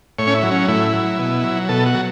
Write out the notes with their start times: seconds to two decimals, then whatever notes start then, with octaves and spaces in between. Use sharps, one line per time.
0.19 A2 C#5
0.27 C#4
0.34 E4
0.43 F#3
0.51 C#4
0.68 A2 E4
0.93 F#3
1.19 B2
1.43 F#3
1.69 B2 A4
1.86 F#4
1.95 F#3